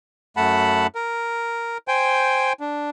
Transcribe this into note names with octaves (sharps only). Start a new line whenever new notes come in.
F#2 A3 F#5 A5 B5
A#4
C5 G5 G#5
D4